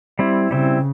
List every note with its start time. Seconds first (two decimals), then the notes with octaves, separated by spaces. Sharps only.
0.19 G3 C4 E4
0.50 C#3 G3 C4 E4